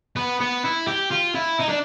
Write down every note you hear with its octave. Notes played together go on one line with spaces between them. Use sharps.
B3
B3
E4
G4
F4
E4
D#4
D4